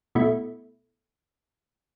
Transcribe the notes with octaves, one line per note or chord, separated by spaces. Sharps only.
B2 A3 E4